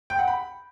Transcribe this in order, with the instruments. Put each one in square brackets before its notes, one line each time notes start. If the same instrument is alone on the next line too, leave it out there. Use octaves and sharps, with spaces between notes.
[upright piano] G5
F#5
B5